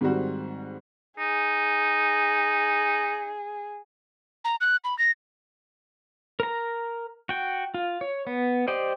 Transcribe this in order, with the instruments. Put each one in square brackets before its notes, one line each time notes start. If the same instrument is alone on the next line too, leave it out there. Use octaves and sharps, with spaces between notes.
[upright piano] G#2 D#3 G3 C4 F#4
[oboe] D#4 [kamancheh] G#4
[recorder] A#5
F#6
B5
A#6
[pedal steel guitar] A#4 A#5
F#4 G5
F4
C#5
B3
G4 C5 D5 D#5